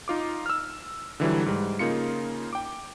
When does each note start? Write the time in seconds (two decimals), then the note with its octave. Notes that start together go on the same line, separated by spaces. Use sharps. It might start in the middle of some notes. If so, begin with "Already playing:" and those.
0.08 D#4 F4 D6
0.46 E6 F6
1.20 D3 E3 F#3 G3
1.46 G#2 G3
1.79 C#3 A#3 D#4 F4 C#7
2.53 G5 D6